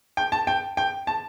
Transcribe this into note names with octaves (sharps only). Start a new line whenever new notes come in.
G5
A5
G5
G5
A5